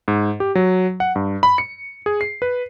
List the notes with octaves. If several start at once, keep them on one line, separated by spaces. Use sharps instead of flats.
G#2
G4
F#3
F#5
G2
B5
C#7
G#4
C7
B4